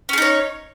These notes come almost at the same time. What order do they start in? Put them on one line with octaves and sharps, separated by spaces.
C#4 G#4 D#4 C#5